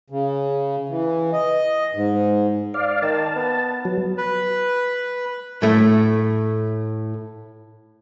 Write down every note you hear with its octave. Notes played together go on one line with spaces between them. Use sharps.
C#3
E3
D#5
G#2
D5 F5
D#3 A5
B3
F#3
B4
A2 A3